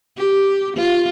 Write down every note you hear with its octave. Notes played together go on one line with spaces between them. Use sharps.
G4
F4